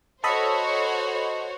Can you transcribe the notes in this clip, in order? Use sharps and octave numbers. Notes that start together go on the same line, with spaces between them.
F#4 A4 C5 C#5 D#5 B5